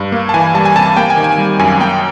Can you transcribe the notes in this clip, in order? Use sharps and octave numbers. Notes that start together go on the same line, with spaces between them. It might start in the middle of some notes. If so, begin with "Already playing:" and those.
Already playing: G2
A#3
A5
E3 G#5
G3 A5
G#5
C3 A5
A5
A#3 G5
G#5
D#3
G#5
G3
F#2 G#5
A#3 G5